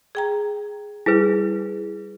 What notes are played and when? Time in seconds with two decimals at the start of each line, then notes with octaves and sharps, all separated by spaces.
0.15 G#4 G5 A#5
1.06 G3 E4 G#4 B4